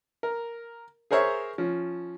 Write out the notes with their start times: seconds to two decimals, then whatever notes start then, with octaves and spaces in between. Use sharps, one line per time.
0.23 A#4
1.11 G#4 A#4 C5 C#5 E5
1.58 F3 C#4